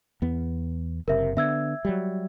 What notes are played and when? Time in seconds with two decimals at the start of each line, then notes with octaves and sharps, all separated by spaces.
0.22 E2 B3
1.08 F#1 C3 A#4 E5
1.37 D3 B3 E5 E6 G#6
1.85 F#3 G3